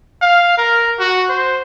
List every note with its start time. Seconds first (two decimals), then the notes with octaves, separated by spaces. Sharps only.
0.21 F5
0.58 A#4
0.99 F#4
1.29 C5